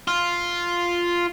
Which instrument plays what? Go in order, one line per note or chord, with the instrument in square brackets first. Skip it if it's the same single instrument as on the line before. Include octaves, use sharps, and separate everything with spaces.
[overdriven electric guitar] F4